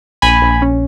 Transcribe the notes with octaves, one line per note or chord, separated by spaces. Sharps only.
A#1 G#5 B5
A#1
C#4